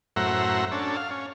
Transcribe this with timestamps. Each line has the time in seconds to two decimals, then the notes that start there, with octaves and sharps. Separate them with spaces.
0.16 F#2 A2 C5 E5 F#5 A#5
0.72 C#4 D4 A4
0.97 F5
1.11 C#4